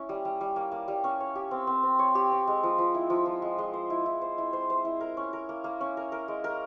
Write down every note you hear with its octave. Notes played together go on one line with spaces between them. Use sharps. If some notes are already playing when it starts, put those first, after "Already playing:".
Already playing: C#4 E4
G3
G3
G3
A#3
A#3
G3
C#4
C#5
G4
C4
C4
C4
C#5
G4
C4
G#3
F3
F3
E4
F3
F3
G#3
G#3
C5
E4
E4
C5
E4
C5
C5
E4
A#4
C#4
A#4
A#3
A#3
C#4
A#4
A#4
G#3
A#4